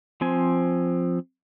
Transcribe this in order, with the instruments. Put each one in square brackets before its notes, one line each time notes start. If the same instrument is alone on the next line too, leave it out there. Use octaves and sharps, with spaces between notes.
[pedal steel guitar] F3 C4 G#5